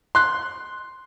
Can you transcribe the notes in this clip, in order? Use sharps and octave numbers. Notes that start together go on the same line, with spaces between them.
C6 F#6